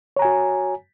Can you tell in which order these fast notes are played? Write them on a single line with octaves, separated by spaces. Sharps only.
C#5 A#5 G#5 F#4